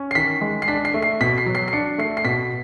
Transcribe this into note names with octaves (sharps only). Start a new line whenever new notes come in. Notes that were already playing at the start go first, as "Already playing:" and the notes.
Already playing: C#4
C7
D#3 B6
G#3
C7
D4 B6
C7
A3
C7
B2 B6
C7
F#3
C7
C7
D4 C#7
A3 C7
C7
B2 B6